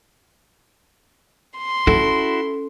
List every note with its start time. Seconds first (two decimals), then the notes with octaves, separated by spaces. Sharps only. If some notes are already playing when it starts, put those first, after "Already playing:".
1.58 C6
1.87 C#4 E4 F#4 A4